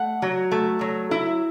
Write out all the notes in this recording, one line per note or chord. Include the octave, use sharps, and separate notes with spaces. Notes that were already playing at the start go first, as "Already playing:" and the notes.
Already playing: A3 F#5
F#3
A3
F#3
E4